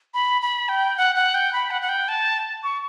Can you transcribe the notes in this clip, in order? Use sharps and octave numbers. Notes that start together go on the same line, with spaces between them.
B5
B5
G5
F#5
F#5
G5
B5
F#5
F#5
G5
A5
C#6